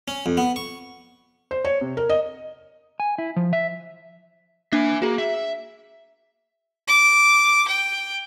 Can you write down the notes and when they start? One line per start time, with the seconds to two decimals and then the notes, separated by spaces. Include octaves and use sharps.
0.08 C#4
0.26 F2
0.37 B3
0.56 C#6
1.51 C5
1.65 C#5
1.81 C3
1.97 A#4
2.09 D#5
3.00 G#5
3.18 E4
3.36 F3
3.53 E5
4.72 A#3 D4 E5 G#5
5.02 A#3 F#4 G#4
5.18 E5
6.88 D6
7.68 G5